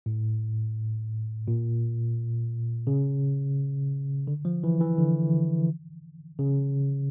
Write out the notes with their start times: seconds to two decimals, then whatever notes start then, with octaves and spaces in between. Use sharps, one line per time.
0.06 A2
1.48 A#2
2.87 C#3
4.27 D3
4.45 F3
4.64 E3
4.81 E3
4.99 D3
6.39 C#3